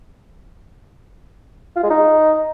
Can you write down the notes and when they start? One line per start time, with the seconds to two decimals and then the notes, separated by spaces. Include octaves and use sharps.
1.76 F4
1.83 G#3
1.90 D#4